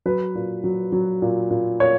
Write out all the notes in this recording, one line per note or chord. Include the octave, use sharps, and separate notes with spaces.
F#3 B4
A#2
F#3
F#3
A#2
A#2
A#2 C#5